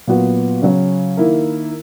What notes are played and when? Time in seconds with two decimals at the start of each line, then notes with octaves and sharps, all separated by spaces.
0.07 A#2 F#3 B3 F#4
0.62 C#3 F#3 C#4
1.17 D#3 A#3 E4 A#4